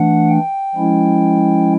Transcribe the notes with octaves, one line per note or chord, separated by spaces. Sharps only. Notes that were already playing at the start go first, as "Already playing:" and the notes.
Already playing: E3 A3 D4 F#5
G5
F3 G#3 C#4 E4